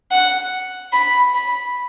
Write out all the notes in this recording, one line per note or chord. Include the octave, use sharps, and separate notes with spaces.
F#5
B5
B5